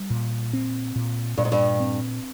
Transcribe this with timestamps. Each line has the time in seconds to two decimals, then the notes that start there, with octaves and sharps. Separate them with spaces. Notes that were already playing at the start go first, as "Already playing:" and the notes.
Already playing: G3
0.10 A#2
0.53 C4
0.96 A#2
1.37 G2 A#2
1.45 G#2
1.52 G2
1.80 C4